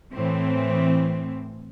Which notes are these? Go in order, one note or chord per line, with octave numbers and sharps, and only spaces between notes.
A2 E3 C4